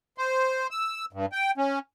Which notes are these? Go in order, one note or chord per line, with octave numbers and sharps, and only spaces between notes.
C5
E6
G2
G5
C#4